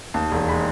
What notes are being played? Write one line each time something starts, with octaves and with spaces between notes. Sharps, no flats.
D#2 A5
E1
G#3 B5